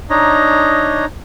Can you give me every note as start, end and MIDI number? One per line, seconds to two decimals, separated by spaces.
0.10 1.05 62
0.10 1.05 63
0.10 1.05 73
0.10 1.05 75
0.10 1.05 82